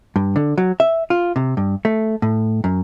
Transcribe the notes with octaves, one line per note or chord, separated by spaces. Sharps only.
G2
D3
F#3
E5
F4
C3
G2
A3
A2
F#2